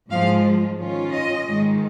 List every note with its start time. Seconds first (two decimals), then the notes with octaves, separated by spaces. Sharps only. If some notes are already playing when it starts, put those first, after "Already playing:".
0.09 G#2 F3 G#3 F4 F5
0.78 D#3 C#4 F4
1.12 D#5
1.46 G#2 D#3 G#3